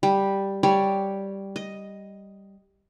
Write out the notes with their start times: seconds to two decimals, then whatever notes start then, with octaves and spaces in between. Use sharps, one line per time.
0.03 G3
0.63 G3 C#5 D5
1.56 D#5